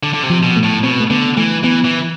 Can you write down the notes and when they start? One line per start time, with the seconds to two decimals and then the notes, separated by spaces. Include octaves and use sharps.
0.03 D3
0.14 D3
0.23 C3
0.30 F3
0.43 B2
0.56 A3
0.63 A2
0.84 B2 C4
1.00 A3
1.10 D3 B3
1.37 E3 A3
1.64 E3 B3
1.85 E3